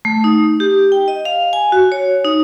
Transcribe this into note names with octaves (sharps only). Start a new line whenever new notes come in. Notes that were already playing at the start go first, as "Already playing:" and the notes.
A3
D#4
G4
G5
D#5
F5
G#5
F#4
C#5
D#4